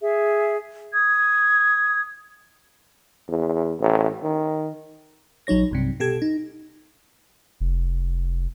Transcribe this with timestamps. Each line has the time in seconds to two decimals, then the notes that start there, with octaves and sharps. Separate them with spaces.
0.01 G#4 E5
0.93 D#6 G#6
3.28 E2
3.80 A1
4.22 D#3
5.47 A#1 F#3 D#4 C#5 A#6
5.71 B1 G2 C3
6.00 B2 G4 A4 G#6
6.22 D#4
7.60 F1